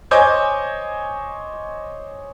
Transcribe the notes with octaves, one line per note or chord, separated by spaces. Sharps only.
C5 C#5 D#5 G#5 D6 G6